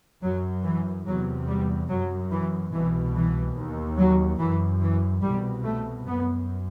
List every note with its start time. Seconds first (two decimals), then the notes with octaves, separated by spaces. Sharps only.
0.22 F#2 F#3
0.64 E3
1.06 E2 C3 F#3
1.48 G3
1.89 F#2 F#3
2.31 E3
2.73 C2 B2 E3
3.14 E3
3.56 D#2
3.98 F#3
4.40 F#2 E3
4.81 E3
5.23 C2 B2 G3
5.64 A3
6.07 F#2 B3